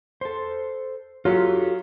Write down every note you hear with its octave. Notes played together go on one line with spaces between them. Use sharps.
A4 C5
F#3 F4 G4 A4